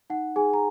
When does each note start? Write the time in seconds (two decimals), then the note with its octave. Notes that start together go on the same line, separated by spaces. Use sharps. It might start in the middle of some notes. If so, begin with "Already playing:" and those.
0.10 D#4 F#5
0.36 D#4 G#4 G#5
0.54 A#5